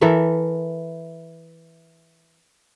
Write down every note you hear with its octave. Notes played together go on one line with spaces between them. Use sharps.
E3 A4 A#4 E5